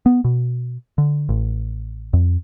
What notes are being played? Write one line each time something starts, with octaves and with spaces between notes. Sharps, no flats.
B3
B2
D3
A1
F2